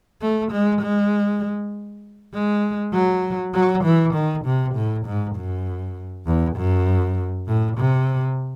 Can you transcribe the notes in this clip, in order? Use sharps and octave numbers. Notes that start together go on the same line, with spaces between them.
A3
G#3
G#3
G#3
F#3
F#3
E3
D#3
C3
A2
G#2
F#2
E2
F#2
A2
C3